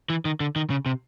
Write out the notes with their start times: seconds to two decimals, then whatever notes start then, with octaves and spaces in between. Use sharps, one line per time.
0.10 E3
0.25 D#3
0.40 D3
0.56 D#3
0.70 C#3
0.86 C3